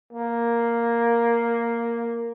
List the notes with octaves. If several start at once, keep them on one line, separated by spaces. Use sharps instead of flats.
A#3